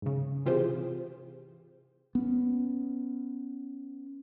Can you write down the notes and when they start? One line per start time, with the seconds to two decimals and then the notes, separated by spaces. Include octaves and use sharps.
0.02 G#2 C#3
0.46 C3 E3 F4 G4 G#4 C5
2.15 B3 C#4